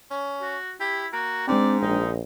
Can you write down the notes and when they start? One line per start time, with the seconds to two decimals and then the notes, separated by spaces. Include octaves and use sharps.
0.11 C#4
0.42 F#4
0.80 E4 G4
1.13 A#3 F#4
1.48 G#2 G#3 C4 D4 D5 G5
1.82 A#1 D#4